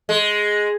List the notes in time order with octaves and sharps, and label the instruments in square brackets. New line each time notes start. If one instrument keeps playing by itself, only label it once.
[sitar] G#3